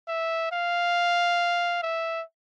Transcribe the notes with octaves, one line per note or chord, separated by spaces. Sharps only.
E5
F5
E5